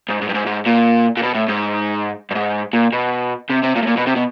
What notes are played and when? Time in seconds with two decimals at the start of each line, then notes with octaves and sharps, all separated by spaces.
0.09 G#2
0.21 G#2
0.29 G2
0.34 G#2
0.47 G#2
0.67 A#2
1.17 A#2
1.23 B2
1.35 A2
1.48 G#2
2.31 G2
2.35 G#2
2.73 A#2
2.93 B2
3.50 C3
3.63 C3
3.75 A#2
3.82 A2
3.87 A#2
3.97 B2
4.07 C3
4.16 B2